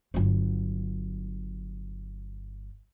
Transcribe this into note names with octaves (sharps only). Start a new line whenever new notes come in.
G1 F#3